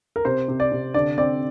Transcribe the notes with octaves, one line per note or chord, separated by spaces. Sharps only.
A#4
C3 C5
C3
D5
C3
D3 D5
C4 D5